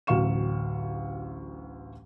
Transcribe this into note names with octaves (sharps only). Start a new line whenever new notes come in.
A1 D2 F#3 F5 C#6 E7